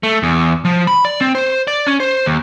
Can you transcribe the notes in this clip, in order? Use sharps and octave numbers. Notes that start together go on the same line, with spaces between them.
A3
E2
F3
B5
D5
C4
C5
D5
C#4
C5
D#2